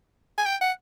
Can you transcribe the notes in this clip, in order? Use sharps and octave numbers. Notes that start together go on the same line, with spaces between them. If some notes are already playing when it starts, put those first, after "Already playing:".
G#5
G5
F#5